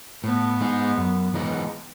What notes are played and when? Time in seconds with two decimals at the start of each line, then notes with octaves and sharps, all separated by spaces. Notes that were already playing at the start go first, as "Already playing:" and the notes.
0.24 A2 B3
0.61 G#3 D#4 G#4
0.98 F#2
1.34 E3 G#3 B3 D#4